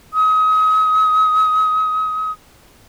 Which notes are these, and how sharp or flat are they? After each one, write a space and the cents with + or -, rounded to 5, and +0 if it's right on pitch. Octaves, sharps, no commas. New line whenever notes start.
D#6 +35